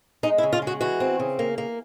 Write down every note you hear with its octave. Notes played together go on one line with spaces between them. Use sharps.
G#3 D#4
E4
C#3
F4
G#3
F#4
E3 F#4
C4
C#3
A#3
A#3